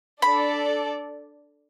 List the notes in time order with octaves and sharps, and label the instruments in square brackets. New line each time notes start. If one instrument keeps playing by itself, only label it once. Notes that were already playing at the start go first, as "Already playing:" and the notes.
[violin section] D4 A4 D5 [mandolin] B5